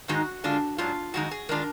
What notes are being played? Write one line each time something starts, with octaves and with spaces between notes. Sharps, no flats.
G#2 D#3 G#3 D#4 F#4
D3 G#3 D4 F4
G#2 F#3 D4 F4
F2 D#3 G#3 D#4 F#4
G#4
D#3 G#3 D4 F4 A#4